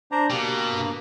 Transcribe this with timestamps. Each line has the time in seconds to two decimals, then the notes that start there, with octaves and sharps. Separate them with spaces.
0.12 D4 C5 A#5
0.30 B2 A#3 G4
0.71 G2